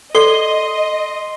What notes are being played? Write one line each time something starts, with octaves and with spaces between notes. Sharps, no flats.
A4 D5 D#5 C6 C7 G7